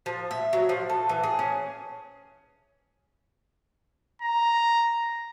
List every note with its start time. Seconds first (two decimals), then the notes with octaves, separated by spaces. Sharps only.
0.06 F3
0.31 E5
0.53 F#3
0.69 F3
0.90 A4
1.09 E3
1.23 G#4
1.39 C#4
4.21 A#5